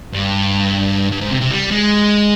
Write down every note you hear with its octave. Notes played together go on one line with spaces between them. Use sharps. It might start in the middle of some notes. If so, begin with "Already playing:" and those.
G2
G2
G#2
C3
C3
G3
G#3